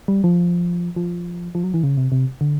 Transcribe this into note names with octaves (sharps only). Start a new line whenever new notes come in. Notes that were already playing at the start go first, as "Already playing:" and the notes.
G3
F3
F3
F3
F#3
E3
C#3
C3
C3
D3